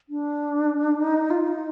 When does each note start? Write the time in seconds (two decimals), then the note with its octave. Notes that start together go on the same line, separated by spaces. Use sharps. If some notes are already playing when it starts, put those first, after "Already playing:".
0.09 D4
0.96 D#4
1.30 F4
1.48 D#4